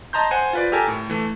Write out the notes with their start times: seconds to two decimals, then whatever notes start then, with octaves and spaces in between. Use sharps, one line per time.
0.13 D#5 A5 A#5 C6 G6
0.31 C5 F#5 G#5
0.53 F4 B4 D5
0.72 G4 A4 A#4 G#5
0.88 A2
1.09 E3 A3